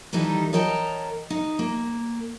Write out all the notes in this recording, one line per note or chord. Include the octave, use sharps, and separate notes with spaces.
D#3 E3 G3 D#4 A4
A#4 C#5 D#5 G5 A5 A#5
D#4
A#3